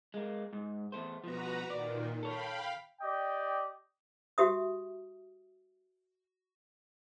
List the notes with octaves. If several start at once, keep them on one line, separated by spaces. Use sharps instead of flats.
G#3 A#3
G#2
E2 A3 C5
B2 F3 F#4 B4 A#5
A#2 D#3 D5
A4 C#5 F5 G5 B5
G4 D5 D#5 G5
F#4 G4 E5 D#6